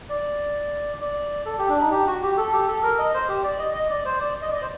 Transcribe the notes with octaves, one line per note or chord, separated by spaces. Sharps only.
D5
D5
A4
G4
D4
D#4
G4
F#4
G4
A4
G4
A4
A#4
D#5
C5
G4
D5
D#5
D#5
D5
C5
D5
D#5
D5
C5